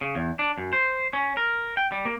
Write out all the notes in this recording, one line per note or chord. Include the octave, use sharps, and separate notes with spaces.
C#3
E2
D4
F#2
C5
C#4
A#4
G5
G3
A#3